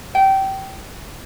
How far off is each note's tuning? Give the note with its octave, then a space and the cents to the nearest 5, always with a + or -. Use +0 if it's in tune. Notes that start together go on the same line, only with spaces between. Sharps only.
G5 -20